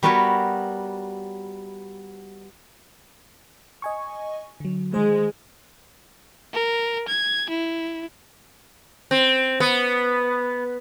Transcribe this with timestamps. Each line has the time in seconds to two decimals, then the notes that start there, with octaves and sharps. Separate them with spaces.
0.03 G3 B3 F#4 A#4 B4 C#5
3.82 D#5 G#5 C#6
4.60 D3 F#3
4.94 D#3 G#3 C5
6.53 A#4
7.08 G#6
7.49 E4
9.11 C4
9.60 B3